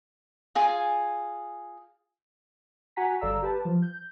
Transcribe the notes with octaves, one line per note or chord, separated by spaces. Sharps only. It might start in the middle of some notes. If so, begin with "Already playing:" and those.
F4 G#4 G#5
F#4 F#5 G#5 A#5 B6
G1 A4 D5 F5 A#5 E6
G4 B4 A5
F3
G6